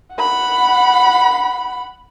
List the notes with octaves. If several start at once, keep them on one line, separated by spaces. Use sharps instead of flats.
F#5 B5